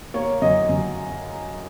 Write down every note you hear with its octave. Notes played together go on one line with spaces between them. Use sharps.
A#3 C#5
F#2 D#5
F#2